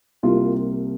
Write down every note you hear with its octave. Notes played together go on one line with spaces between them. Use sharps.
C2 C3 G3 A#3 F4